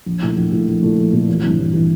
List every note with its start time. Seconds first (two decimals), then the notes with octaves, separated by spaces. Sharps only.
0.06 A#1
0.22 A#2 A3 E4
0.36 A#1
0.52 A#2 A3 E4
0.68 A#1
0.83 A#2 A3 E4
0.97 A#1
1.13 A#2 A3 E4
1.29 A1
1.43 G2 E3
1.59 A1
1.74 E3